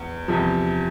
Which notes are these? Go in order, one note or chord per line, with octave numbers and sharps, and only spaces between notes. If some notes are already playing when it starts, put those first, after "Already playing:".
Already playing: E2
E2 C3 F3